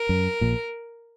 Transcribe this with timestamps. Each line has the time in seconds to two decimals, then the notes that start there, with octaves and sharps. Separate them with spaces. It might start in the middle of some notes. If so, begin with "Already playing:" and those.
Already playing: A#4
0.09 F#2
0.41 A#1 A#2